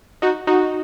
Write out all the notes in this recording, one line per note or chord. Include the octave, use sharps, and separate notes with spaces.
D#4 F#4
D#4 F#4